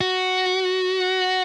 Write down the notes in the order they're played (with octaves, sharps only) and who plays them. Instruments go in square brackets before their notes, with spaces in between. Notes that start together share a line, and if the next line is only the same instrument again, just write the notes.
[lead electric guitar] F#4